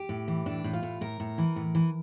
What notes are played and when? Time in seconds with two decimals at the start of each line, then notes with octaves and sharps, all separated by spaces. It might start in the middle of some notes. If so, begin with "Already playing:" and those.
Already playing: G4
0.09 A2
0.28 E3
0.46 A2 D4
0.64 A2
0.73 F4
0.83 A2
1.01 A2 A#4
1.20 A2
1.38 E3
1.56 A2
1.75 E3